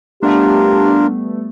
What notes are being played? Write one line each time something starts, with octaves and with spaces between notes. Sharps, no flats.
G3 A3 B3 D4 F4 G4 A#4